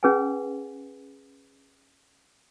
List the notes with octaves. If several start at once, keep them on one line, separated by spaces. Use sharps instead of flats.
C#4 G#4 B4 F#5 G#5